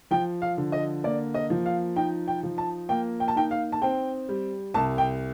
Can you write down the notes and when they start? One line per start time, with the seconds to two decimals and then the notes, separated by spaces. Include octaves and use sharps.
0.11 F3 G5
0.42 F5
0.57 D3
0.72 D#5
1.04 A#3 D5
1.34 D#5
1.50 F3
1.66 F5
1.96 D#4 G5
2.28 G5
2.43 F3
2.58 A5
2.89 A#3 G5
3.20 G5
3.28 A5
3.36 D#4 G5
3.51 F5
3.72 A5
3.82 C4 G5
4.29 G3
4.74 C2 A5
4.98 G5